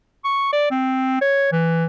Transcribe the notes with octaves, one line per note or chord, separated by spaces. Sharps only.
C#6
D5
C4
C#5
E3